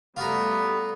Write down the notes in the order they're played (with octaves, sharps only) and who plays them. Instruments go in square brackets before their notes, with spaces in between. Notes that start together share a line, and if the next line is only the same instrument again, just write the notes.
[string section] G3 A3 [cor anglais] B3 [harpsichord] F4 F#4 A#5